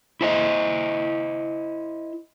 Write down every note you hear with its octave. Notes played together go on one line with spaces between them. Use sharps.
E4 C5 D#5